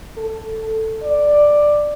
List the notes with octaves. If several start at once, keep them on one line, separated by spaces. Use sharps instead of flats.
A4
D5